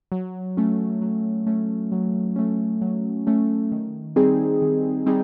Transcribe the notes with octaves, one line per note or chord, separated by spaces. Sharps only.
F#3
A3 C#4
F#3
A3 C#4
F#3
A3 C#4
F#3
A3 C#4
D#3
G3 C4 D#4 G#4
D#3
G3 C4 D#4 G#4